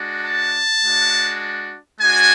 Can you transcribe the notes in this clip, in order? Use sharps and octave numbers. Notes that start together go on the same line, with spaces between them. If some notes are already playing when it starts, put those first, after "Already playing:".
Already playing: G#3 D4 F#4
A5
G#3 D4 F#4
G#3 D4 F#4 G#5